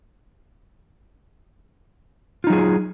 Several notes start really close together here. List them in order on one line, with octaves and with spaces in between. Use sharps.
F4 D#4 F#3 G#4